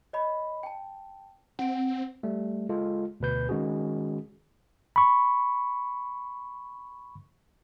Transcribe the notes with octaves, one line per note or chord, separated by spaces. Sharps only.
C#5 D#5 B5
G5 A5
C4 F#5 D7
G3 A3
G#3 F4 A4
D2 B2 B4 G6
D#3 G#3 C#4 F#4 G#4
B5 C#6